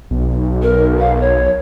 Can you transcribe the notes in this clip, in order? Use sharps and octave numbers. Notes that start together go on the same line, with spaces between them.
B1
A#4
F5
C#5